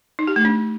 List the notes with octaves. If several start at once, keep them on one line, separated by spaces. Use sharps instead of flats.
D#4
G4
A3
D4